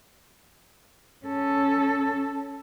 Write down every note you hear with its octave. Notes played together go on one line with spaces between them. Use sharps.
C#4 A4